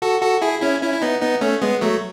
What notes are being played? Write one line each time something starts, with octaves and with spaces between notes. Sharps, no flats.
F#4 A4
F#4 A4
E4 G#4
C#4 E4
C#4 E4
E4
B3 D#4
B3 D#4
A3 C#4
G#3 B3
F#3 A3